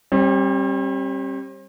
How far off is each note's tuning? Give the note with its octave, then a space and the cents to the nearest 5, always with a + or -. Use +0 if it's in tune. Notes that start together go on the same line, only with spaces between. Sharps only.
G3 +0 C4 +45